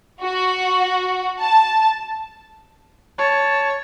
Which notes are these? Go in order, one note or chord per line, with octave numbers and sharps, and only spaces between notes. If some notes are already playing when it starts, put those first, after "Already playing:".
F#4
A5
C#5 A5